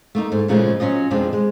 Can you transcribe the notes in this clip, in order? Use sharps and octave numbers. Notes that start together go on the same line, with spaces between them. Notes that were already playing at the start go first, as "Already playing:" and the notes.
A3 A#3 D#4
G#2
A#2 C#3 F3 G#3 A3
F#3 C#4 F4 D#5
F2 B2 F3 G#3 D4
G#3